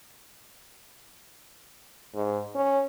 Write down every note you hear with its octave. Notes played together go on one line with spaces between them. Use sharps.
G#2
C#4